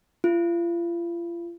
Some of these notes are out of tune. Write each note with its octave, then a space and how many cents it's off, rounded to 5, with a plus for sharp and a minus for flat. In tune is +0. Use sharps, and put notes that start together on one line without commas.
F4 -40